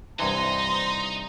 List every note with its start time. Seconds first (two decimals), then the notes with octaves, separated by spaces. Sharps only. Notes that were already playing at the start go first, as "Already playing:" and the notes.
0.19 C2 G2 E3 D#4 C5 A#5 C6